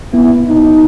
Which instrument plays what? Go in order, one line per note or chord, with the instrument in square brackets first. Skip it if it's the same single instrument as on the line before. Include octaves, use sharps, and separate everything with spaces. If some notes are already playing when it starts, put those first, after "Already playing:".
[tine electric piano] B3 [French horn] E4
[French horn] D#4